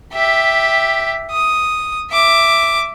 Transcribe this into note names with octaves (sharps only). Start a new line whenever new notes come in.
G4 E5
D#6
E5 D6